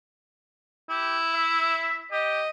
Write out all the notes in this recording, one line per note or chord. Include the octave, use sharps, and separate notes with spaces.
E4 G4
E5
G4 D#5